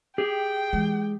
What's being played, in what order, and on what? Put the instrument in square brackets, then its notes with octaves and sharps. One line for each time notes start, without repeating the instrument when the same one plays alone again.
[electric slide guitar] G4 G#4 [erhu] G5
[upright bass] E3 G#3